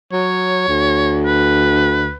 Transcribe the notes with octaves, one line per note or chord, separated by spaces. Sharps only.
F#3 C#5
D2
B4